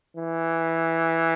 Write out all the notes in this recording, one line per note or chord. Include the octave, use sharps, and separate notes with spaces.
E3